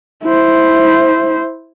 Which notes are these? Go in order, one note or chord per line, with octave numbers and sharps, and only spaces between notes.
E4 C5